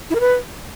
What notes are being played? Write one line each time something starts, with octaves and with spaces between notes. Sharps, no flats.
E4
A#4
B4